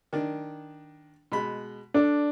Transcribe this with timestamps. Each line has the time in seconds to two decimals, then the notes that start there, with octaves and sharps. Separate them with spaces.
0.13 D#3 D4
1.32 B2 G#3 B5
1.94 D4 A4 D5